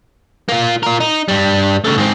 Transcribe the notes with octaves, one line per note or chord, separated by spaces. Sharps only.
A#3 F4
F4 A#4
D#4
G2 G3
C#3 A3
G#2 C4